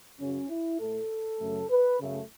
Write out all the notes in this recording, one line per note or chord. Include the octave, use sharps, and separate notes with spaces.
F#2 C#3 F#3 C#4
E4
A2 A3 A4
F#2 C#3 F#3 A3
B4
F#2 C#3 A3